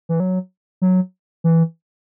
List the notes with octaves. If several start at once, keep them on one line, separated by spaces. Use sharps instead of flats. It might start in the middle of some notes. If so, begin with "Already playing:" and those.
E3
F#3
F#3
E3